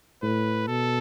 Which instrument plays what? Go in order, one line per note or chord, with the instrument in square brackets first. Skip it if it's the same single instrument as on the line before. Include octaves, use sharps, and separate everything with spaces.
[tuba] A2 [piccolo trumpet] B4
[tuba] B2 [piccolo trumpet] A4